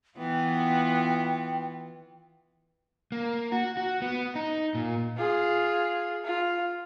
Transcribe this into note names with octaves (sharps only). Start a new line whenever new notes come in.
E3 B3 F4 G5
A#3
F#4
F#4
B3
D#4
A#2
F4 G#4
F4